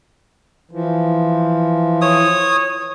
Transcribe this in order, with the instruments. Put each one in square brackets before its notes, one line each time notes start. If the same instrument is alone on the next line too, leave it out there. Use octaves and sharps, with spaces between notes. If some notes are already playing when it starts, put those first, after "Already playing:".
[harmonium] E3 F3
[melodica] C#5 D#6